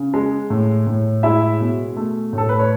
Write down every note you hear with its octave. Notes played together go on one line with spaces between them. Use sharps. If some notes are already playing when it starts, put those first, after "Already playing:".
Already playing: C#3
G#3
A2
A2
G#3 E4 E5
B2
A3
A2 A4
B4
C#5